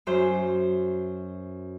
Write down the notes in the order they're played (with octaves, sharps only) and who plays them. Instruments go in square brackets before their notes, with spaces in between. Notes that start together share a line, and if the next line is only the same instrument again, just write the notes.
[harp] F#2 C5